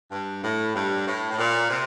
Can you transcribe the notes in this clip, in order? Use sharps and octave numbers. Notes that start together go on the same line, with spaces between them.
G2
A2
G2
A2
A2
A#2
C3